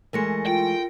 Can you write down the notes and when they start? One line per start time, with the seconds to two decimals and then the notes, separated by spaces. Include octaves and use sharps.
0.13 E3 G#3 A3 A#4 A#6 C#7
0.47 F4 G5